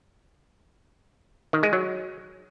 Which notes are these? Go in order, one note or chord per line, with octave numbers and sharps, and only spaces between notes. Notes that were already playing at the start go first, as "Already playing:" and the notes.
D#3
G#3
F#3